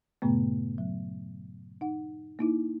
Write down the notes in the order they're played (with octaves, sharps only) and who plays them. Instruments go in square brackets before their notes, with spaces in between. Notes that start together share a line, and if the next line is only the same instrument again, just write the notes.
[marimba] G2 A#2 C#3 A3 B3
F#3
D#4 F#5
A#3 D#4 E4